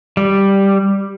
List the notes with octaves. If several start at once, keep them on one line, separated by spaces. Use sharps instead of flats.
G3